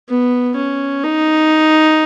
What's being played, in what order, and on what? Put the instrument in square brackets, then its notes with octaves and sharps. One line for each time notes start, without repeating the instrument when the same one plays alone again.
[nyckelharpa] B3
C#4
D#4